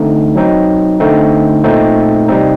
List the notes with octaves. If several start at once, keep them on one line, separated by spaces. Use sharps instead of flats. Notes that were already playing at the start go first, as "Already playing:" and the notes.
Already playing: D3 A3 C4 D#4
F#3 C4 D#4
D3 A3 C4 D#4
A#2 A3 C4 D#4
C3 G3 C4 D#4